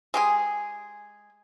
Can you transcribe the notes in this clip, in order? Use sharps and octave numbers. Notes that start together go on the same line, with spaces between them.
G#3 G4 G#4